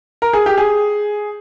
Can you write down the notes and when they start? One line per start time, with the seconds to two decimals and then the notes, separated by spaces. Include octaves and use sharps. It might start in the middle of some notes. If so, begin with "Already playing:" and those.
0.22 A#4
0.33 G#4
0.46 G4
0.58 G#4